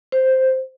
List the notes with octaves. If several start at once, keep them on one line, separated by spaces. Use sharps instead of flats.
C5